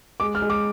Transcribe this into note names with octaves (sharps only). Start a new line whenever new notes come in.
G#3 D6
F6
G#3
D6